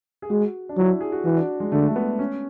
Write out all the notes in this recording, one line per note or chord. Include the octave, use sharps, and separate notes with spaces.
G#4
G#3 F#4
D4
F#3 E4
F#4
G#4
F#4
E3 F#4
D4
G#3
D3 A3
A3
B3
C#4